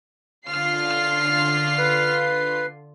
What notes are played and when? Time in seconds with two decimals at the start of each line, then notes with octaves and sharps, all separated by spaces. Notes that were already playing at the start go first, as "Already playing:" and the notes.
0.48 D3 F4 F6 C7
1.78 B4